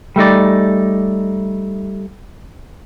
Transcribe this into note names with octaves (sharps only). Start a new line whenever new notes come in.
G3 A3 D#4 D5